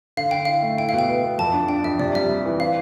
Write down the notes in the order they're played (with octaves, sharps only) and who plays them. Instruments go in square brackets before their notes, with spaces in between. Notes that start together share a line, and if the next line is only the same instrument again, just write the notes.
[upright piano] D3 [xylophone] F5
[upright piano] D3 [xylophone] G5
[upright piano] E4 [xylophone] F5
[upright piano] A3
[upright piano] E4 [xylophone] G5
[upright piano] B2 [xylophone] F5
[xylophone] G5
[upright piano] B3
B3
[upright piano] F2 [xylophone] A5
[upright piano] D4
[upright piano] D4 [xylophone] G5
[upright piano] F2 [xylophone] E5
[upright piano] C3 [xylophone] D5
[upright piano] G3 [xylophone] E5
[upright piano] G3
E3
[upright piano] C4 [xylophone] F5